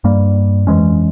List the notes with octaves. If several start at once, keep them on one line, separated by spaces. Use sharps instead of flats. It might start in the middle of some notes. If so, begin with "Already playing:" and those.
G2 G3 A#3
F2 E3 G#3 C#4